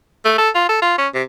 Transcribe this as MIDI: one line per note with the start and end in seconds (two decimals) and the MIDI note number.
0.25 0.34 57
0.38 0.50 69
0.55 0.68 65
0.69 0.78 69
0.82 0.96 65
0.98 1.08 61
1.14 1.23 48